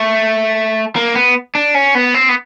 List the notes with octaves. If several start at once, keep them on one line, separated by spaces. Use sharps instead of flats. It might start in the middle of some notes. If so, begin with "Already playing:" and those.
Already playing: A3
A#3
B3
D4
C#4
B3
C4
B3